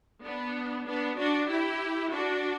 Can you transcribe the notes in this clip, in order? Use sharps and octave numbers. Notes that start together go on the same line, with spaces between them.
B3 D4
B3 D4
D4 F#4
E4 G4
D4 F#4